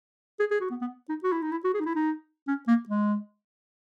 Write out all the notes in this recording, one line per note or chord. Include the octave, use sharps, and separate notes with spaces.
G#4
G#4
F#4
B3
B3
D#4
F#4
E4
D#4
E4
F#4
G#4
D#4
E4
D#4
C#4
A#3
G#3